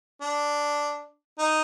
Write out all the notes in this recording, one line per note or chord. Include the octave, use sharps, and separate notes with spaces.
D4
D#4